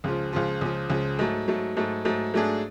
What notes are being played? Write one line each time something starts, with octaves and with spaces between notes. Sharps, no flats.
C#2 C#3 F3
C#2 C#3 F3
C#2 C#3 F3
C#2 C#3 F3
G#2 F#3 A3
G#2 F#3 A3
G#2 F#3 A3
G#2 F#3 A3
G#2 F#3 A3 D4 G#4